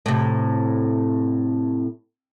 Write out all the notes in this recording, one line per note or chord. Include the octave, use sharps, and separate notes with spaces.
A2 C3